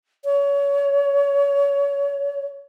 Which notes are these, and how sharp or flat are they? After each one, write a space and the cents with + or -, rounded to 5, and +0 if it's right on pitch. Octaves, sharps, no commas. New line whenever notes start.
C#5 +25